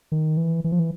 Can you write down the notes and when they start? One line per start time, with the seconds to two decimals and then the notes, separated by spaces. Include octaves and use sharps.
0.12 D#3
0.37 E3
0.64 E3
0.72 F3
0.79 E3